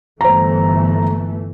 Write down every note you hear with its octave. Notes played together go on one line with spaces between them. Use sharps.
G1 E3 A3 C5 A#5